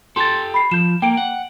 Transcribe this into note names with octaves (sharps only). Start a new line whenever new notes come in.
G4 A4 C6 A6
B5 C7
F3 G6 E7
A#3 G5 D7
F#5